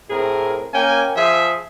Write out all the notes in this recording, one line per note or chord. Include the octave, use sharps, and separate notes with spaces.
A2 C4 G#4 A#4
A#3 C#4 G5 G#5
F3 G#4 E5